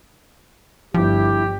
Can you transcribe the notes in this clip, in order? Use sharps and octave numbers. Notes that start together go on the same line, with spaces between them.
G1 F3 D4 E4 G4